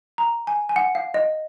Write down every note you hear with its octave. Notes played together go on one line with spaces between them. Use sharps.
A#5
G#5
G#5
F#5
F5
D#5